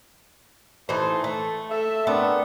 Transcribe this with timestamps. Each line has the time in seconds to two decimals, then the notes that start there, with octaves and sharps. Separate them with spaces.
0.89 E3 A3 D#4 C5
1.24 A3 A4
1.70 A4 E5
2.07 A3 B3 C4 D4 A#4